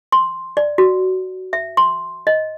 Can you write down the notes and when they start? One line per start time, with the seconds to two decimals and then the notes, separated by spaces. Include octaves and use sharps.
0.12 C6
0.57 D5
0.78 F#4
1.53 E5
1.77 C6
2.27 D#5